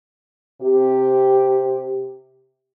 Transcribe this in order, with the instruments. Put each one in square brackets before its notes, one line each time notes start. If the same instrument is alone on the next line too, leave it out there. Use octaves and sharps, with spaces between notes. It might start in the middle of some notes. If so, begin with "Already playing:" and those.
[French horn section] C3 G4